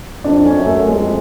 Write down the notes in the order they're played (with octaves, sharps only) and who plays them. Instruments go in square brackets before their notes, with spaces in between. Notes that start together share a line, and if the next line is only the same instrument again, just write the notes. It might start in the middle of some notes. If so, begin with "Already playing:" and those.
[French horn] F2 [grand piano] D4
[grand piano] C#4
[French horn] F#2
[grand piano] A3
[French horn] F2 [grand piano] G#3